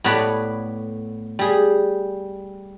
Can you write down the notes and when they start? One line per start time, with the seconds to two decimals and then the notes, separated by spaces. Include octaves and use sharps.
0.04 A2 B3 B4 C#5 D5 B5
1.39 G3 G#4